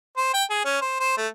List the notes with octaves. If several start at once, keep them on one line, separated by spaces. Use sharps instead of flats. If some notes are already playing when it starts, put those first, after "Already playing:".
C5
G5
G#4
C#4
C5
C5
A3